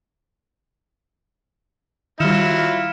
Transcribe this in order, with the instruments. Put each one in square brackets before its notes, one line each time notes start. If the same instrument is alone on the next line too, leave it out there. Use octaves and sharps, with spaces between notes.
[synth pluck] D#3 G3 [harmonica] F#3 E4 F4 [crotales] F6 C#7 E7